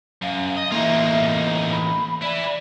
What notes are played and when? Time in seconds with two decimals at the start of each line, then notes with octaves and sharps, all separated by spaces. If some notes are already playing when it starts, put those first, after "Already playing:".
0.22 F#2 F5
0.57 D#5
0.72 E3 A3 A#3 D#4 F4 E5
1.72 B5
2.22 E4 B4 D5